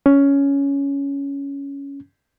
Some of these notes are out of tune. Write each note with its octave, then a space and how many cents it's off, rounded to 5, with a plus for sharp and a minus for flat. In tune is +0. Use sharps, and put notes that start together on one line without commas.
C#4 +10